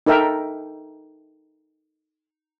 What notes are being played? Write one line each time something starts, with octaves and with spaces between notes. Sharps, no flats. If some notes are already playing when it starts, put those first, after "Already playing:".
D#4 A4 A#4 E5 G5